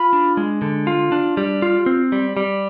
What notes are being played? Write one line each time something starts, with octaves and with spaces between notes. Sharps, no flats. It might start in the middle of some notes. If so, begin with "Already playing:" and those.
Already playing: F4 B5
D4
G#3
D3
F4
D4
G3
F4
C4
G3
G3